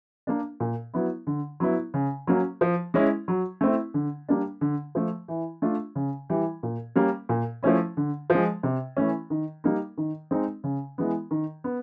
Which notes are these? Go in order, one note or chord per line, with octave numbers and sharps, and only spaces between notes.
A#3 D4
A#2
F#3 B3 E4
D3
F#3 B3 E4
C#3
F#3 A#3 C#4
F3
G#3 C#4 E4
F#3
A3 C4 E4
D3
G3 A#3 D4
D3
F3 A3
E3
A3 D4 F4
C#3
E3 G3
A#2
G3 A#3 C#4
A#2
F3 A3 C#4 E4
D3
F3 G#3
C3
E3 A3 C#4
D#3
G3 A#3 D#4
D#3
G#3 C4 D#4
C#3
E3 G#3 B3
D#3
B3